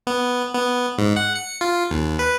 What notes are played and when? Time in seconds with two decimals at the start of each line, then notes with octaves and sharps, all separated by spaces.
0.07 B3
0.55 B3
0.98 G#2
1.16 F#5
1.35 C#7
1.61 F4
1.90 D#2
2.19 B4